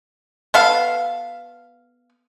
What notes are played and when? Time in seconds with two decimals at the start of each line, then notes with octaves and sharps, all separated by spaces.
0.54 B3 A4 F5